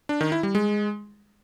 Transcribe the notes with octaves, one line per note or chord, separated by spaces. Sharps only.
D4
D#3
E4
G3
G#3